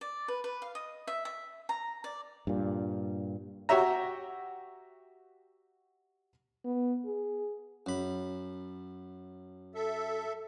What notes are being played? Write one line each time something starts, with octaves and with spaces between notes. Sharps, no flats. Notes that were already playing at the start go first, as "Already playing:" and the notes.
D5
B4
B4
F5
D#5
E5
E5
A#5
D5
G2 A#2
F#4 G4 C#5 E5 A#5
B3
G#4
F#2 B5
A4 E5